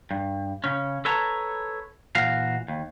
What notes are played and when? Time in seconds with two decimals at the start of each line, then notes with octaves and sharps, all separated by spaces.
0.11 G2
0.64 C#3 C#4
1.05 A4 B4 C#5 A5 A#5
2.15 A#2 E3 F#4 F5
2.68 D#2